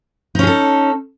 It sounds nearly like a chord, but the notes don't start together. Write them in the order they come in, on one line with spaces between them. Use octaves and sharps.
D#4 C#4 G#4 A4